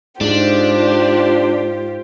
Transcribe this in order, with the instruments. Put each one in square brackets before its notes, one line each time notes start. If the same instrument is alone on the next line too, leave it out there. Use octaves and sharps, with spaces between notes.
[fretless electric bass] G#2 [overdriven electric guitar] D4 [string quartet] F4 G4 C5